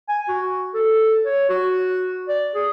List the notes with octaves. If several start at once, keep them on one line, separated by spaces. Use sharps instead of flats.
G#5
F#4
A4
C#5
F#4
D5
G#4